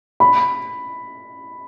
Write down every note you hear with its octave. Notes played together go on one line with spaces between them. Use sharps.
B5